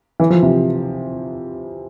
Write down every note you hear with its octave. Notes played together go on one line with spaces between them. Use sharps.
E3
F3
C3